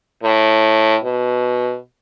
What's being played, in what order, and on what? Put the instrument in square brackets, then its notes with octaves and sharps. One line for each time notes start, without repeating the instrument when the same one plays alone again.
[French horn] A2
B2